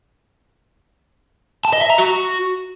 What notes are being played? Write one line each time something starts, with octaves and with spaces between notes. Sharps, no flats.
A5
D#5
E5
A#5
F#4